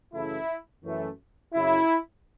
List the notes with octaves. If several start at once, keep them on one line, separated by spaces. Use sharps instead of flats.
F#2 C#3 E3 A3 E4
F#2 E3 A3
F#2 C#3 F#3 E4